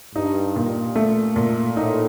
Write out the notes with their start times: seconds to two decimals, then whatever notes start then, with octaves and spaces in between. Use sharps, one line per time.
0.15 G2 D#4
0.56 A#2
0.96 A3
1.36 A#2
1.76 A2 D#4